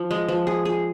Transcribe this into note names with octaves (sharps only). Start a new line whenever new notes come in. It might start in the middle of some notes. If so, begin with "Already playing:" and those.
Already playing: F3
G#3
F3
G#4
G#4